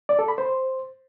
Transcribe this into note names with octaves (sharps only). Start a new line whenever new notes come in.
D5
A4
B5
C5